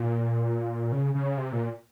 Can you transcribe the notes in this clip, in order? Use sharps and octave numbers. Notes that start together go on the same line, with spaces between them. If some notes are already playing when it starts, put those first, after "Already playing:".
Already playing: A#2
C#3
C#3
C3
A#2